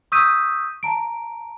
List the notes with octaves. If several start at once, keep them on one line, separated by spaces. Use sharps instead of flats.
C#6 D#6 E6 G6 B6 D#7
A5 A#5 D7